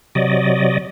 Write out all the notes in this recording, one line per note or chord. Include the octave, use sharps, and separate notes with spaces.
C3 F#3 D5 D#5